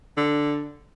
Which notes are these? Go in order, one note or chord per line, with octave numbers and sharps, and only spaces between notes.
D3